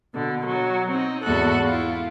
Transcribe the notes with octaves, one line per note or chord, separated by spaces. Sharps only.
B2 D3
F#3
C4 D#4
E2 G#2 F#4 A4 F#6
E4 F4